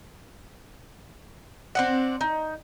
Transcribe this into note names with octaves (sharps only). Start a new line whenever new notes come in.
C4 D4 F#5
D#4